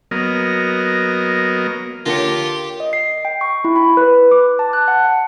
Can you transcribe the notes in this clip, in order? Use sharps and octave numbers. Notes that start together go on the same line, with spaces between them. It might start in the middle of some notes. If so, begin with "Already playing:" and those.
F#3 A#3 B3 A#4 D#5
D3 A#3 F4 G4 A4 A#4 C#5
D#5
C7
G5
C#6
E4
B5
B4
D6
A5
F#6
F#5
F#5